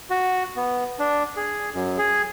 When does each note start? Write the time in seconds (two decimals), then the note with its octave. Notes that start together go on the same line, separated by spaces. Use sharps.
0.10 F#4
0.56 B3
0.99 D4
1.37 G#4
1.74 F#2
1.98 G#4